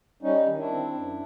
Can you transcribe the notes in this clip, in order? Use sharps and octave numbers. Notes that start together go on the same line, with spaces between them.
G3 C#4 D#4
D#3
D4 E4
C4
F#2